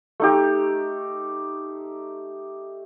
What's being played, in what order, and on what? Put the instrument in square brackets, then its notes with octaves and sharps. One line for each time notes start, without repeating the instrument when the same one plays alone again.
[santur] A3 D#4 G4